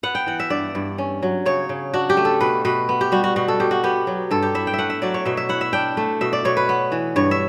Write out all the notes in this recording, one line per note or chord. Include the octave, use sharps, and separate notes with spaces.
B3 F#5
G5
E3 F#5
E5
G2 D5
G2
C#4
F#3
C#3 C#5
C#3
D4 F#4
G4
A3
A4
B2 B4
B2 B4
B3
G4
G3 F#4
F#4
B2 F#4
A4
B2 G4
F#4
B3 G4
F#3
G2 A4
G4
E4 E5
G5
E5
A3 F#5
E5
F#3 D5
C#5
B2 E5
E5
E4 F#5
E5
D4 G5
A3
B2 E5
D5
B2 C#5
B4
B3
E3
G2 C#5
E5